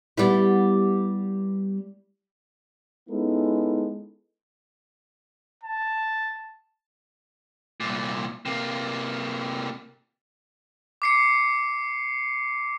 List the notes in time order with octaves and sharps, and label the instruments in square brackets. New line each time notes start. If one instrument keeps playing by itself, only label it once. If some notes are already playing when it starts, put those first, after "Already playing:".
[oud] G3 B3 E4
[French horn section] G#3 B3 C#4 D#4 E4 A4
[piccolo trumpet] A5
[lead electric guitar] C2 A#2
C3 A#3
[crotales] D6 C7 C#7